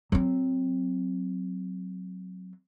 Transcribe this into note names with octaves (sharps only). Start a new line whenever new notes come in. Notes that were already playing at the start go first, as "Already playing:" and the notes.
F#3 C4